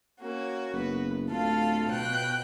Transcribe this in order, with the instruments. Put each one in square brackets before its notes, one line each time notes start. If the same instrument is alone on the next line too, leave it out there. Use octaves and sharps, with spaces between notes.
[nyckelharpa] A#3 C#4 [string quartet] F#4
[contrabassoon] F#1 [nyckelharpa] B3 B4
[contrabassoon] D1 [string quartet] A3 A4 F5 [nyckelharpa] F4
[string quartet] B2 G5 F#6